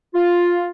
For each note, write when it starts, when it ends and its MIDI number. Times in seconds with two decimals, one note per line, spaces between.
0.14 0.66 65